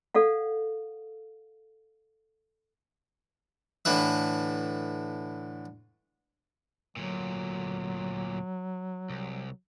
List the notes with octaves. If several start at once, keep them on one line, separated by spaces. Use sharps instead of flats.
A4 D5 F5 F#5
A2 D3 E3 B4 E5
D2 A#2 F#3
C2